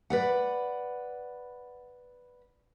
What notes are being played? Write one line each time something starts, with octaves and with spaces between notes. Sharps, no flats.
B4 D5 F#5